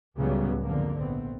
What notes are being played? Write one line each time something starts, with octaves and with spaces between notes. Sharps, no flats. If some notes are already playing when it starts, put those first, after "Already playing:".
C#2 A2 C#3 F#3 G3 B3
F2 G#2 D3 A#3
A#1 B3 C4